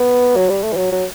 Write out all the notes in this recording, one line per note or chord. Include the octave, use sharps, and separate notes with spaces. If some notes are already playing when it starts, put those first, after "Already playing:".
Already playing: B3
F#3
G3
A3
E3
F#3
F#3